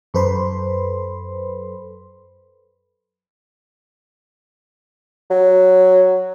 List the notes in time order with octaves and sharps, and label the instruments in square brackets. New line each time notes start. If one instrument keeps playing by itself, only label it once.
[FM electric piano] F#2 A4 B4 C5 B5 C6
[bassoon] F#3